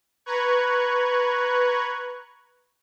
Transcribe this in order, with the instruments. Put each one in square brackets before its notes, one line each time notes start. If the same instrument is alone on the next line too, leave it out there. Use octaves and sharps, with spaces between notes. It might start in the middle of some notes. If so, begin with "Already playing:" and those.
[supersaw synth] B4 A#5 C#6 F#6 G#6